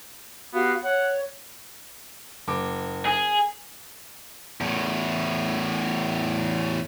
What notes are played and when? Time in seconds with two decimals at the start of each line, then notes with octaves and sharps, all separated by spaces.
0.54 B3 F#4 G4 F5
0.84 C#5 F#5
2.47 F#1 D6
3.06 G#4
4.61 E2 A2